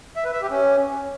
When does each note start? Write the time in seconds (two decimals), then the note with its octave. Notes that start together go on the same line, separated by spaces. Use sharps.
0.16 E5
0.25 B4
0.33 E5
0.42 G4
0.50 C#4